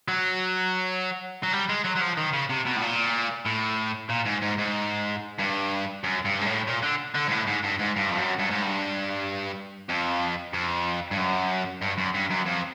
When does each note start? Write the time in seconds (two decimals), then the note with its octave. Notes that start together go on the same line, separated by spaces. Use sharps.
0.08 F#3
1.43 F#3
1.53 G3
1.69 G#3
1.85 F#3
1.96 F#3
2.01 F3
2.18 D#3
2.33 C#3
2.49 C3
2.65 B2
2.76 A2
2.81 A#2
3.46 A2
4.10 A#2
4.26 G#2
4.42 G#2
4.58 G#2
5.39 G2
6.04 F#2
6.25 G2
6.41 G#2
6.46 A2
6.67 A#2
6.83 D3
7.15 D3
7.28 G#2
7.31 A2
7.47 G#2
7.64 G2
7.79 G#2
7.96 G2
8.10 F2
8.17 F#2
8.39 G2
8.50 G#2
8.62 G2
9.89 F2
10.53 F2
11.11 G2
11.18 F#2
11.82 G2
11.98 F#2
12.14 G2
12.30 F#2
12.46 F2